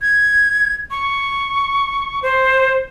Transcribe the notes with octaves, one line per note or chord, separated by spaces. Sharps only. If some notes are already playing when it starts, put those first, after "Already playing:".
G#6
C#6
C5